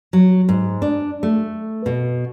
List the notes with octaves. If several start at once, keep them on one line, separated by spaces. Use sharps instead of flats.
F#3
G#2
D4
A3
B2